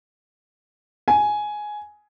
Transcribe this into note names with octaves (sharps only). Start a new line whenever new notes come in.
G#5